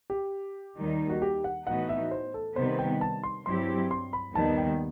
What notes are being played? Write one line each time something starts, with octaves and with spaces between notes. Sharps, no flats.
G4
D#2 D#3 G3 D#4
F#4
G4
F#5
A2 E3 B3 D#4 F#4 F#5
E5
C5
A4
C3 D#3 G3 B3 C5
G5
A5
C6
G2 F#3 C4 E4 G4 C6
C6
B5
D#2 D#3 G3 B3 A5
G5